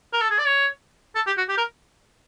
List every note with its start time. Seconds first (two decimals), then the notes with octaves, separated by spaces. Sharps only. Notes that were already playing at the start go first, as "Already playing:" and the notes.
0.13 A#4
0.22 A4
0.30 G#4
0.39 D5
0.46 C#5
1.15 A4
1.27 G4
1.38 F#4
1.49 G4
1.58 A#4